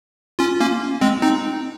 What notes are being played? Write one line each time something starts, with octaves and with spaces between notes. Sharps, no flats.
C#4 F4
A#3 C#4
G#3 C4
C4 D#4